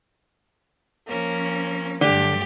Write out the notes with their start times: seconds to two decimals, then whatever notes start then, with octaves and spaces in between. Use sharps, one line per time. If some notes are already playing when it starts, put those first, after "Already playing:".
1.08 F3 A#3 C#4
2.01 G2 D3 F#3 A3 G4